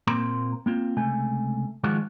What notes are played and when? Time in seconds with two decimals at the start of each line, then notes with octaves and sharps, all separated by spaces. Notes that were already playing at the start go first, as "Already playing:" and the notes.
0.07 A#2 A#3 C4 A#5 C6
0.66 A#3 C4 F4
0.97 C#2 C3 A3 G#5
1.84 D#3 F3 G#3 F4 F#4